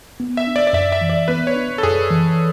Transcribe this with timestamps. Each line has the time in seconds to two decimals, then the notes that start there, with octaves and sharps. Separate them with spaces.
0.20 B3
0.37 E5
0.47 D4
0.56 D5
0.67 D5
0.73 F#2 E5
0.92 E5
1.01 E3
1.09 D5
1.28 B3 B4
1.47 C#5
1.56 D4
1.78 A4
1.83 F#2 G#4
2.10 E3